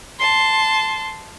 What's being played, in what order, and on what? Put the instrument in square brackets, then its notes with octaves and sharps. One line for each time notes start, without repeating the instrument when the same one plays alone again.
[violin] A5 C6